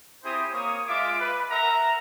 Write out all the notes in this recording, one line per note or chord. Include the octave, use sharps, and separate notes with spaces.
C4 E4 G4 G#4 C5 D#6
A#3 C#5 D#6
G#3 F4 E5 D6
B4
A#4 E5 F#5 A#5